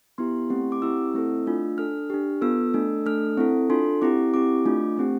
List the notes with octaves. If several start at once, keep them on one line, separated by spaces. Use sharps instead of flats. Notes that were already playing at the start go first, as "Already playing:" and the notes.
B3 E4 G4 C6
A3 C4 E4 G4
D6
C4 E4 G4 E6
A3 C4 E4 A4
A3 D4 F4
D4 A4 F6
D4 G4
B3 F4 A4 E6
A3 D4 A4
A3 D4 A4 F6
C4 E4 A4
D4 F4 A4 C6
C4 E4 G4 D6
C4 E4 G4 D6
A3 D4 F4
A3 C4 G4